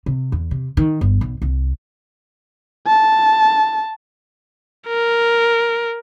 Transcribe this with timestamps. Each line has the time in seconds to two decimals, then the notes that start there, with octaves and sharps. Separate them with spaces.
0.06 C3
0.32 E2
0.51 C3
0.77 D#3
1.01 G1
1.21 B1
1.42 C2
2.87 A5
4.88 A#4